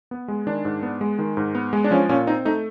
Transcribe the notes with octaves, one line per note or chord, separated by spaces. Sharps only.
B3
G#3
D#3 D4
G#2
B3
G#3
D#3
G#2
B3
G#3
D4
F3 C#4
A#2 C#4
C4 D#4
A3 D#4